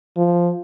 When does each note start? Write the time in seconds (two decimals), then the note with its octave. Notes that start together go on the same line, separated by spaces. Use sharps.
0.17 F3